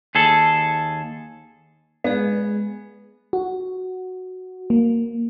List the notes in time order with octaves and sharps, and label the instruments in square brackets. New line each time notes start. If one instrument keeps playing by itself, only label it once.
[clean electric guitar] D#2 G#4 A4
[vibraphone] G#3 G#4 [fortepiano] B3
[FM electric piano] F#4
A#3